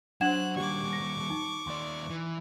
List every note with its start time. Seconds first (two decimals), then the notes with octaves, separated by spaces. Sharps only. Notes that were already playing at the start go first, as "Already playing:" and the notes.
0.21 F#3 D4 C5 F#5 F#6 G#6 E7
0.56 D#2 G3 F#4 G4 D5 C#6 D6
0.93 A#6
1.30 D#4
1.67 D#2 D5 C6
2.10 E3